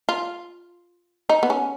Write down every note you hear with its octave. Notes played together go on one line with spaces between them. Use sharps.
F4
D#4
B3
C#4